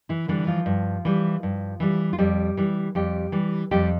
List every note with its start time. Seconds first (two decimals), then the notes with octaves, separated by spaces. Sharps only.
0.09 E3 E4
0.28 D3 E3 G3 D4
0.47 F3 F4
0.66 G2
1.05 E3 G3
1.43 G2
1.80 E3 G3
2.13 F4
2.18 F2 G3 G4
2.57 E3 G3
2.95 F2 G3 G4
3.32 E3 G3
3.71 F2 G3 G4